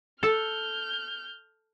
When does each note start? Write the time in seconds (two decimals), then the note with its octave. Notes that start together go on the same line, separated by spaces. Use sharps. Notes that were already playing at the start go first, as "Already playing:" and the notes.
0.23 A4 F6 G6